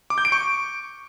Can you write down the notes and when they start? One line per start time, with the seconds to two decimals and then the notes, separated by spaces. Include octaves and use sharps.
0.10 D6
0.18 G6
0.25 D7
0.32 C#6